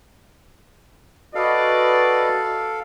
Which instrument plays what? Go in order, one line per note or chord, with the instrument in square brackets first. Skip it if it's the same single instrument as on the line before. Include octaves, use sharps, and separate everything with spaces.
[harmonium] F#4 B4 D#5 [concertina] A4 F5 [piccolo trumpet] D5